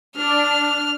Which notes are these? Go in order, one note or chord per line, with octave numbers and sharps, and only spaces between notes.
D4 F6